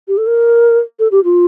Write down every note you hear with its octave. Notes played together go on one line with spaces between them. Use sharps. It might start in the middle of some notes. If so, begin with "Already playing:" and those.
G4
A4
A#4
A4
G4
F4